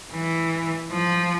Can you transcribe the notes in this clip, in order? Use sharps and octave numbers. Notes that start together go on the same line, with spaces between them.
E3
F3